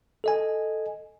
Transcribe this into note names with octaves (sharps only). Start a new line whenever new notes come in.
A4 D#5 G#5